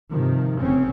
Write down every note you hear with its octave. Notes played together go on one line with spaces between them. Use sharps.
G2 C3 D#3 F3
F1 C#3 C4 C#4